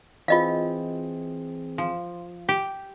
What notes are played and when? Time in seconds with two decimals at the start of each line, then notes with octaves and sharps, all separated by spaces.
0.28 E3 C4 F4 G#4 D#5 F5
1.78 F3
2.49 G4